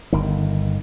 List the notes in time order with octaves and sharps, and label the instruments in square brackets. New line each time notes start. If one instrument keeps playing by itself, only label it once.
[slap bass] G1 D#3